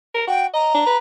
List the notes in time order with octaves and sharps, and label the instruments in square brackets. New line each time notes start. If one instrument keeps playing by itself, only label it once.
[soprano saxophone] A#4
[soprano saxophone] F#4 [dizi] G5
[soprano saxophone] D#5 [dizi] A#5
[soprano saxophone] D4
B4